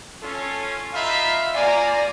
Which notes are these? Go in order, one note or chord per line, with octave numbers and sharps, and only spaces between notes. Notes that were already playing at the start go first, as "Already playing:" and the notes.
C#4 F4 A4
D#4 F4 E5 F5 B5
A#3 F4 D5 G#5 A#5